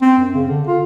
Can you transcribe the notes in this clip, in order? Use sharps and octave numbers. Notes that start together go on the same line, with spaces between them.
C4
F#2
C#3
D3
F4